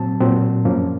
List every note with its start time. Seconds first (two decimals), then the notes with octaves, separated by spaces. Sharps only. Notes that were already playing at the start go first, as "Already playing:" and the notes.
Already playing: A#2 F#3 C4 A5
0.20 A#2 F#3 C4
0.65 F#2 F3 A#3 C#4